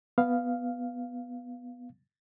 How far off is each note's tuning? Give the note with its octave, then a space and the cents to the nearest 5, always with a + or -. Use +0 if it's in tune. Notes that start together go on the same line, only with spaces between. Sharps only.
B3 +0 F5 +0